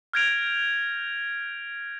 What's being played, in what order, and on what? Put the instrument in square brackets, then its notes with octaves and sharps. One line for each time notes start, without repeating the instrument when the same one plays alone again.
[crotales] F6 G6 G#6 A#6 D7 F7